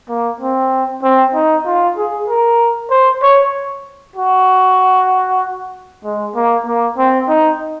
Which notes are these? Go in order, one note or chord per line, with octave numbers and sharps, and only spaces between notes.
A#3
C4
C4
D#4
F4
G#4
A#4
C5
C#5
F#4
G#3
A#3
A#3
C4
D#4